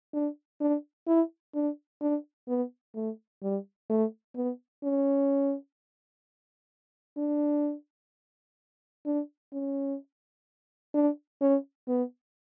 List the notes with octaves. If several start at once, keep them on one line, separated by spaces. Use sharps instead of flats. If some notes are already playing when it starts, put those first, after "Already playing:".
D4
D4
E4
D4
D4
B3
A3
G3
A3
B3
C#4
D4
D4
C#4
D4
C#4
B3